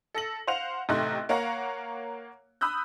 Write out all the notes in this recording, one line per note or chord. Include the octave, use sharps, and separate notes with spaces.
A4 A#6 F#7
C5 F5 F#5 F7
A1 C3 A3 D#4 C6 F#6
A#3 C#5 F5 F#5 A#5
B5 D#6 E6 F#6 G6